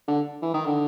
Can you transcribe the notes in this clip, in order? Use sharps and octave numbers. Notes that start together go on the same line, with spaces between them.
D3
E3
D#3
D3